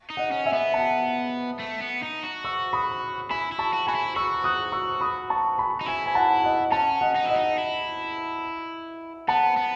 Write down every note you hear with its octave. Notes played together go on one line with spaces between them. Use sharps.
D#4
D#5 F#5
C#4
E5 G#5
B3
F#5 A5
A3
B3
D#4
F#4
C#6 E6
B5 D#6
E4 G#5 B5
E4
A5 C#6
F#4
F#4 G#5 B5
E4
F#4 C#6 E6
D#6 F#6
C#6 E6
B5 D#6
A5 C#6
G#5 B5
D#4
E4 G#5 B5
G#5
F#5 A5
D#5 F#5
C#4 F#5 A5
D#5 F#5
D#4
E4 D#5 F#5
D#4
E4
B3 F#5 A5
B3